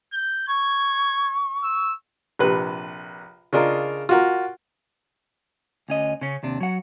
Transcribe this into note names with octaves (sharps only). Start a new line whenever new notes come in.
G6
C#6 G#6
E6
A#1 C3 B4
C#3 D4 F4 A#4 D#5
F4 F#4 A#4
D2 C#4 D#5
C#3 C#4
D#2 C3 D4
F#3 F#5